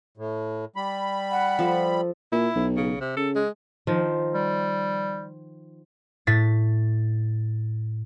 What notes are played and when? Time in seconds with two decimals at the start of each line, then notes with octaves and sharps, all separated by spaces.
0.17 A2
0.76 G3 B5
1.31 F#5
1.59 F3 A4
2.32 A#2 E4
2.56 B1
2.76 C#3
3.00 C3
3.17 C#3 A4
3.35 G#3
3.87 D#3 F3
4.35 G3
6.27 A2 A6 B6